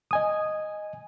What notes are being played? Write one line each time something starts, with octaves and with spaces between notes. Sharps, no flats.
D#5 G#5 D#6